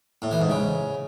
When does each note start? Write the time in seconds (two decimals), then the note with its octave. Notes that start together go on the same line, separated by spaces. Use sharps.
0.22 A2
0.31 E3
0.41 G#2
0.50 C#3